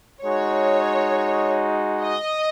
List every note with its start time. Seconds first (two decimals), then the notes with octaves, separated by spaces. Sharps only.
0.22 G#3 D#4 F#4 C#5
2.04 D#5